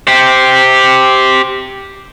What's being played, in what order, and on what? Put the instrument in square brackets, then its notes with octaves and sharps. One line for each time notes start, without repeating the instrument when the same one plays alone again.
[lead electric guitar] G4 C5